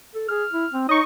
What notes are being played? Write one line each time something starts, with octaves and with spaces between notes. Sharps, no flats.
A4
G#4 F6
E4
C4
D#4 C#5 D#5 C#6